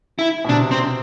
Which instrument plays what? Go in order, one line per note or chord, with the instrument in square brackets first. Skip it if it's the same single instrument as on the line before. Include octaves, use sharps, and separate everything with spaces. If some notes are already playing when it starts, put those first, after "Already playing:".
[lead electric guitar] E4
[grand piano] B2
[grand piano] C3 [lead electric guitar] D4
[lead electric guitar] C4